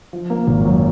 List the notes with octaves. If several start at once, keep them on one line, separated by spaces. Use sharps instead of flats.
F3
A#3
G#1
F#2